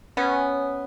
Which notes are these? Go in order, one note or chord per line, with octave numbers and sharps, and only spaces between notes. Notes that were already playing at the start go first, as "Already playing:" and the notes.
B3 C#4